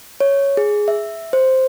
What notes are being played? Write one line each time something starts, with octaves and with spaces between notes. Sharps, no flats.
C#5
G#4
E5
C5